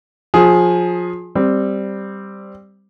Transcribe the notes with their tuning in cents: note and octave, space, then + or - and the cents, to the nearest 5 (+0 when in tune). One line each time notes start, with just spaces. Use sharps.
F3 +25 G#4 +10
G3 +0 C4 +0